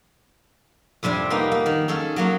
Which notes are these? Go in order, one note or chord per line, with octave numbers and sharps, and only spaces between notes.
F2 C3 G3 D4 G#5
A#3 B3 D#4
A#3
D#3
C#4 G#4 A4
F#3 A#3 C#4